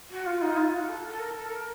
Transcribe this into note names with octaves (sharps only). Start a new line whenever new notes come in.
F#4
F4
D#4
F4
F#4
A4
A4
A#4
A4
A#4